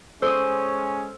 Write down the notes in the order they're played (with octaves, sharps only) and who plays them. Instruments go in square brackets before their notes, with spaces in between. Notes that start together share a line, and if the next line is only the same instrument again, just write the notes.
[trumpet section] G#3 C#4 [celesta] A4 E6 [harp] C5 D#6